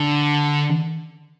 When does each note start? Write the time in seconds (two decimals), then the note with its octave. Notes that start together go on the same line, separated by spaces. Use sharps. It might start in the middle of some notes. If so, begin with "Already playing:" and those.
Already playing: D3